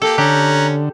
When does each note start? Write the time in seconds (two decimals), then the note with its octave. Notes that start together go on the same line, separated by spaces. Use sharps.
0.02 A#3 G4 A4
0.18 D3 C#4 G4 A#5 F#6